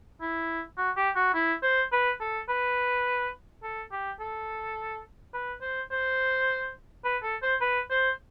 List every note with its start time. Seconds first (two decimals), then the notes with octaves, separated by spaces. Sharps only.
0.21 E4
0.77 F#4
0.97 G4
1.16 F#4
1.34 E4
1.63 C5
1.92 B4
2.21 A4
2.49 B4
3.63 A4
3.92 G4
4.20 A4
5.34 B4
5.62 C5
5.91 C5
7.04 B4
7.23 A4
7.42 C5
7.61 B4
7.91 C5